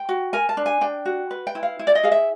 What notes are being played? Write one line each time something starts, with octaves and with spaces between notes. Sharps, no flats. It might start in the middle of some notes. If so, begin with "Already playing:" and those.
Already playing: G5
F#4
A#4 G#5
A5
D4
G#5
D4 G5
F#4
B4
G5
E4
F5
E4
D5
D#5
G#4 F5
E5